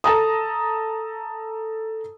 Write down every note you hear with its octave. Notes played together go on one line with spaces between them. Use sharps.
A4 A5 A#5 D#6